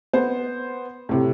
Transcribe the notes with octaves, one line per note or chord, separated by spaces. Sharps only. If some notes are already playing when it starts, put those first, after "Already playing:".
B3 C5
A2 C3